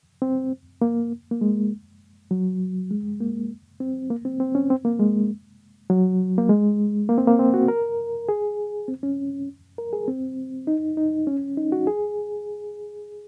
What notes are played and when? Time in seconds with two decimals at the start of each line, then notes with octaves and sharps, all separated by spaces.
0.22 C4
0.82 A#3
1.31 A#3
1.41 G#3
2.31 F#3
2.91 G#3
3.20 A#3
3.80 C4
4.10 A#3
4.25 C4
4.40 C4
4.55 C#4
4.70 C4
4.85 A#3
5.00 G#3
5.90 F#3
6.38 A#3
6.49 G#3
7.09 A#3
7.18 C4
7.27 A#3
7.39 C4
7.54 F#4
7.68 A#4
8.29 G#4
8.88 C4
9.03 C#4
9.78 A#4
9.93 G#4
10.08 C4
10.67 D#4
10.97 D#4
11.27 C#4
11.57 D#4
11.72 F#4
11.87 G#4